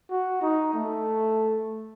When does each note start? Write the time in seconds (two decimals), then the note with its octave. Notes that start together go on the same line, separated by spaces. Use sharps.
0.11 F#4
0.42 D#4
0.74 A3